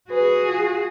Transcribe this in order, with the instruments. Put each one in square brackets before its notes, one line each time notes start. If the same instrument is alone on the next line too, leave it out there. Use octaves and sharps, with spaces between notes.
[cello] F#4 G#4 [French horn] B4
[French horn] F4